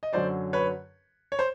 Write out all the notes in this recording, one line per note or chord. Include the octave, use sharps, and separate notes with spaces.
D#5
F#2 D3 F#3 C5 D5
B4 C#5
C#5
C5